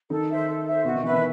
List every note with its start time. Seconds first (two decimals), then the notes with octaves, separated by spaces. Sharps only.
0.10 D#3 D#4 A4
0.29 C5 E5
0.48 A4
0.66 C5 E5
0.85 B2 B3 F#4
0.94 D#3
1.03 E3 B4 E5
1.13 D#3